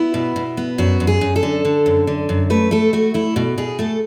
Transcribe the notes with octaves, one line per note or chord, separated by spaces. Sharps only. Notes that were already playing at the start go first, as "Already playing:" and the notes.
Already playing: B3 E4
B2
B2
B3
F#2 F#4
F#2
G#4
F#2
A4
D3
D3
F#2
D3
F#2
A3 B4
A3 A4
A3 F#4
A3 E4
B2
B2 G#4
A3 A4